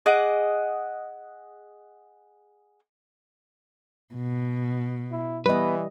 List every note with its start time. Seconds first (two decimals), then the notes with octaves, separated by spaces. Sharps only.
0.06 G#4 D#5 F#5 D6
4.14 B2
5.12 E4
5.46 E3 G3 B3 B4 D#5